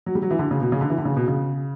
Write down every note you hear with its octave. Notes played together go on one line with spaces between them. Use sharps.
F#3
G3
F#3
E3
D3
C#3
B2
C#3
D3
E3
D3
C#3
B2
C#3